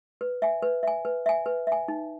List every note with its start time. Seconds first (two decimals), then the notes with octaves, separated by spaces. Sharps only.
0.21 B4
0.42 E5 G#5
0.63 B4
0.83 E5 G#5
1.05 B4
1.26 E5 G#5
1.46 B4
1.67 E5 G#5
1.88 D#4